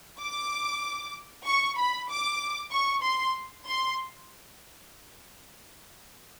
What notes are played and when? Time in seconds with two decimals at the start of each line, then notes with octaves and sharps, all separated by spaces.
0.21 D6
1.46 C#6
1.78 B5
2.10 D6
2.72 C#6
3.03 C6
3.66 C6